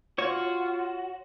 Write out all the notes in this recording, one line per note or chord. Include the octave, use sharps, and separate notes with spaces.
F4 F#4 C#5